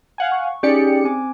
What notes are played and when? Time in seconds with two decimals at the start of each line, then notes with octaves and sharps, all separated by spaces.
0.18 F5 F#5 G#5
0.32 C#6
0.63 C#4 D#4 G4 G#4 D5 C#7
1.04 C4 G#5 D6